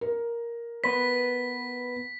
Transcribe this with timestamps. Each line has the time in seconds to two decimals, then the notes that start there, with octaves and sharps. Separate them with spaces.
0.01 A#4
0.84 B3 B4 B6